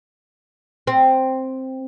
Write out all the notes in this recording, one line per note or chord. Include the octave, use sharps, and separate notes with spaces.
C4